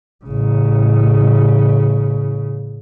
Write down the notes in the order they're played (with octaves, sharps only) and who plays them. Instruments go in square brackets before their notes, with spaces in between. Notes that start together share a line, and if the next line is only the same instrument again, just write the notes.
[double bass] A1 C#3